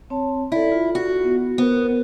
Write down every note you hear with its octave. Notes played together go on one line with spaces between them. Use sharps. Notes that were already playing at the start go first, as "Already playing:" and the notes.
C4 C#5 A5
E4 A4 D5
F4
F#4
B3
B3 A#4 C5